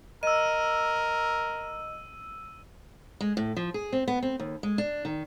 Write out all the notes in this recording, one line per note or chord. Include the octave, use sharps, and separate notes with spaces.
A#4 D#5 E6 D#7
G#3
A2
F3
G#4
C4
B3
C4
D#2
G#3
D4
D#3